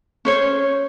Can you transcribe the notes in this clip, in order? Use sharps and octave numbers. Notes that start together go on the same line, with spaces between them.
C#4 C5 C#5